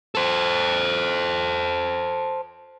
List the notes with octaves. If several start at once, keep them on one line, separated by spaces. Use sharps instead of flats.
A4 C5